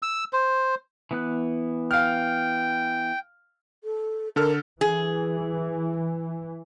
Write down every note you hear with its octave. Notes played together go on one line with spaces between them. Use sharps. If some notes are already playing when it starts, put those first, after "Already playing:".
E6
C5
E3 B3 F#6
F5 G5 F6
A4
D3 A4 A#4 F6
E3 G#4